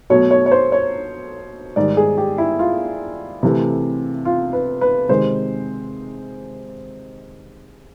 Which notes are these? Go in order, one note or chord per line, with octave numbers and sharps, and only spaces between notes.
B2 F#3 A3 C#5
C#5
C#5
C5
C#5
G#2 D#3 G3 D5
G#4
G4
E4
F4
C3 E3 A3
F4
B4
B4
C3 D#3 G#3 C5